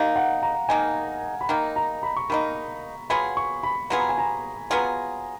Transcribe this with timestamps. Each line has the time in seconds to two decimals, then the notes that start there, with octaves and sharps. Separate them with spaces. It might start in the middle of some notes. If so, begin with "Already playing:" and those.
Already playing: D#3 A#3 D#4 F5
0.16 F#5
0.43 A#5
0.69 D#3 A#3 D#4 G#5
1.41 B5
1.49 D#3 A#3 D#4 A#5
1.76 A#5
2.03 B5
2.17 C#6
2.30 D#3 A#3 D#4 B5
3.10 F#3 B3 F4 G#4 B5
3.37 C#6
3.63 B5
3.90 F#3 B3 F4 G#4 B5
4.00 A#5
4.09 G#5
4.18 A#5
4.70 F#3 B3 F4 G#4 A#5